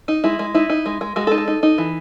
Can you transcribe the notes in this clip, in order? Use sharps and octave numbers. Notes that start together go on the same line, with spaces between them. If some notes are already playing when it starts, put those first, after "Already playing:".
D#4
G#3 E4
G#3
D#4 E4
D#4
G#3
G#3
G#3 F#4
A4
D#4
A4
D#4
D#4
E3